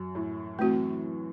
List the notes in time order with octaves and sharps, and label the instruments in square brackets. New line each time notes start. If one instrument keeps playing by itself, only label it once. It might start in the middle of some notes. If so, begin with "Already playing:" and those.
Already playing: [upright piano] F#2
A2
[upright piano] E3 [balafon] A3 C4 F#4